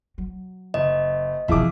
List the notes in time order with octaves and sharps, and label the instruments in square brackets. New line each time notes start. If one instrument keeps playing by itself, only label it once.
[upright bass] F#3
[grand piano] F#1 [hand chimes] D#5
[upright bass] E2 C3 [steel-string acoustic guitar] F3 E4 G#4 [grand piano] E5 D6